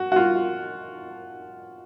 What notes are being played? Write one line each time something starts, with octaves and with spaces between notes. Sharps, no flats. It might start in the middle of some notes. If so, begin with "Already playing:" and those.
Already playing: F#4
F#4
F4